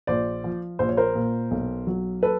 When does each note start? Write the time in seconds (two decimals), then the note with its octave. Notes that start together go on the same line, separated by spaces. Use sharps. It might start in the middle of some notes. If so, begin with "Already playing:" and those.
0.07 A#1 C5 D5
0.44 F3
0.79 A#1 C5
0.89 C#5
0.97 A#4 C5
1.15 A#2
1.51 B1
1.87 F#3
2.23 A4 B4